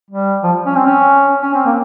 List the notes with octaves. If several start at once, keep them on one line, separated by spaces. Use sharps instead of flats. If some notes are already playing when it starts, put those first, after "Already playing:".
G3
F3
C#4
C4
C#4
C#4
C4
A#3